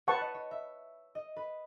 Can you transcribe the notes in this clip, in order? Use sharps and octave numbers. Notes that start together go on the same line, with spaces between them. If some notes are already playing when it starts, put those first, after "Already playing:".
B4 C#5 F#5 A5 C#6
D#5
C#5
E5
D#5
B4